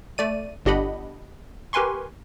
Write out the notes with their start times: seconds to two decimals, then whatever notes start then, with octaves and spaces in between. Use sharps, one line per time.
0.18 A3 D5 D#7
0.65 G1 D4 G4 D#5 F#5 B5
1.73 G4 A#4 B4 G#5 C6 C#6